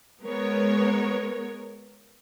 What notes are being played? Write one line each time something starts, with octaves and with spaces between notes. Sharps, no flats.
G#3 B3 A#4 C#5